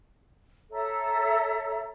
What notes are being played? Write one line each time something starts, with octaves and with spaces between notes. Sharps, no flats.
A4 C#5 E5 A#5